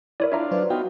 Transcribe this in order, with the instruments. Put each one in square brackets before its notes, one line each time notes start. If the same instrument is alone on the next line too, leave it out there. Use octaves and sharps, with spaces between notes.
[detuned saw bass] E4 [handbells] A#4 C#5 D5
[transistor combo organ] D4 F4 [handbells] C#5 E5 A#5
[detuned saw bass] F#3 [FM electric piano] B4 C5 D5
[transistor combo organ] B3 D#4 F4 [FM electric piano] F#4 G5